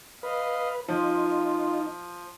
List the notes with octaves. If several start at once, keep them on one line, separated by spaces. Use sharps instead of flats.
B4 D#5 F5
F3 D#4 F4